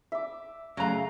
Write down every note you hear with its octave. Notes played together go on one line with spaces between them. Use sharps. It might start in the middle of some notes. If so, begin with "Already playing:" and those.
E5 D6
C#3 F#3 A3 F5 A#5